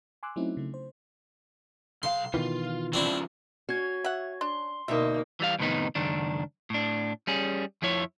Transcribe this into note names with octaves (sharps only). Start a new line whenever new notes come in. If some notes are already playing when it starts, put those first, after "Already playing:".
G#5 C6 D6 E6 F#6
F#3 A3 C4 C#4 D#4 E4
C#3 A3
C5
B1 F5 C6
B2 D#3 E3 F4
C#3 F3 C4 D4 E4
C#4 F#4 G#6
E5 F#5
D4 C6
D2 B2 A#3 D#4 E5
E3 G3 F5
F2 A2 C3 D#3 B3 D#4
C#2 F#2 D#3 D4
A2 D4
G3 C#4 G#4
F2 F3 E4 C#5